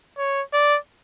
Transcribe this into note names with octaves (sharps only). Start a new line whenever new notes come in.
C#5
D5